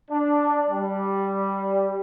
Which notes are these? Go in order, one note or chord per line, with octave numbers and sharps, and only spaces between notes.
D4
G3